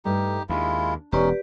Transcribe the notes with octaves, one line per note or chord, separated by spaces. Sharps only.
G2 A3 D#4 G4
D#2 G#3 D4 E4 F4
E1 C#4 D#4 G4 B4 D5